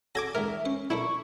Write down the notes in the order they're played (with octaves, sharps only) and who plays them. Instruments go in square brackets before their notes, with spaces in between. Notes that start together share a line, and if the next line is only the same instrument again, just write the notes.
[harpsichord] C#4 F#4 A4 [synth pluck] D6 G#6 A#6
[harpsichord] C#2 G#2 [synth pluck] A#4 [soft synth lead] E5
[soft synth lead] C#4 [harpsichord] C5 C#6
[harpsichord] B1 D4 A#4 [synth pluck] E4 [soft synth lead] C#6